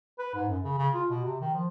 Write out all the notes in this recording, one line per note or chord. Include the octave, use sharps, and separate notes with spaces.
B4
G#2
F#2
C#3
C#3
F4
B2
C3
D#3
F3